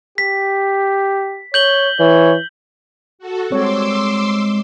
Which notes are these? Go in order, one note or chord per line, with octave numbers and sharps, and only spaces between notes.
G4 B6
C#5 G6 F#7 G7
E3 C#5
F#4 A4
G3 G#3 C4 C#5 C6 D6 E6